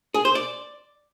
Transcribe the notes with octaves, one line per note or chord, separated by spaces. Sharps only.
G#4
C5
D5